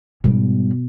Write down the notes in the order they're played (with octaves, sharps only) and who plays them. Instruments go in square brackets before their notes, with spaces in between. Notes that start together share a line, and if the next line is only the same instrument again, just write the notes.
[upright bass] G#2 G3 [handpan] B2